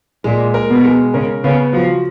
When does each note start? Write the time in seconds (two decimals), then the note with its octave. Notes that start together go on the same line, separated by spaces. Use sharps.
0.24 A#2 G#3
0.54 A#4
0.69 B2
0.84 G#3
1.14 C#3 A#4
1.44 C#3 B3
1.73 F3 F#4